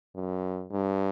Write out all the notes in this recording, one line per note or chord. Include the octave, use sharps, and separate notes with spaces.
F#2
G2